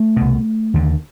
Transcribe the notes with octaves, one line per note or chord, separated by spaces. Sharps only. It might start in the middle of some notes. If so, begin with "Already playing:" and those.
Already playing: A3
C2 B2
D#2 D3